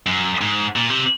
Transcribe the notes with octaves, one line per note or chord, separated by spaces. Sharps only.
F#2
G#2
A#2
C3